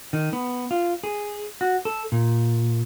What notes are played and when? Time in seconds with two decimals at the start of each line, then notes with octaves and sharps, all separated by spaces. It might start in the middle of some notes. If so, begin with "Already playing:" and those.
0.13 D#3
0.33 B3
0.71 F4
1.03 G#4
1.61 F#4
1.85 A4
2.12 A#2